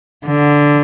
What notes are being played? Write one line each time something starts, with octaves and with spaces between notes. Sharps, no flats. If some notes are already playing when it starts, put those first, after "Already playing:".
D3